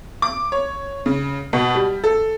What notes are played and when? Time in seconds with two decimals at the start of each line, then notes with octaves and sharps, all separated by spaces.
0.22 D6
0.52 C#5
1.06 C#3
1.53 B2
1.75 G3
2.04 A4